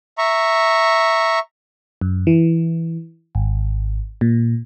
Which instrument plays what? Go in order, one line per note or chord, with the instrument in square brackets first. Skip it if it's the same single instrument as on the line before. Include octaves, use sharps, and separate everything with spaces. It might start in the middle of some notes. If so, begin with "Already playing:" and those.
[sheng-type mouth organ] E5 A#5 C#6
[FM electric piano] F#2
E3
G#1
A#2